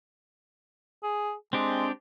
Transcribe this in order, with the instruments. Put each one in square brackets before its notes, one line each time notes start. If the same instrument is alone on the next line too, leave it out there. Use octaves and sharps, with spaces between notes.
[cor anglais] G#4
[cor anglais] G#3 [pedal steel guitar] C4 D4 G4